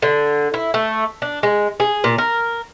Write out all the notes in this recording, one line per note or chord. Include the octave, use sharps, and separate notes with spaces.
D3
E4
A3
D4
G#3
G#4
A#2
A#4